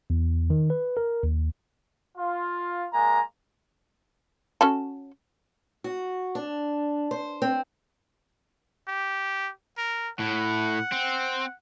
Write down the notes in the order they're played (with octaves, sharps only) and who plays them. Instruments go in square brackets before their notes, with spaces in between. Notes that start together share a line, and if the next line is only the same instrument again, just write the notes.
[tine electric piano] E2
D#3
B4
A#4
D#2
[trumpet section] F4
G#3 A#3 G#5 A#5
[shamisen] C#4 F#4 A4
[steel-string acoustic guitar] F#4
D4
C5
C4
[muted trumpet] G4
A#4
[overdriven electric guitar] A2 [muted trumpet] F#5
[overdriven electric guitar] C4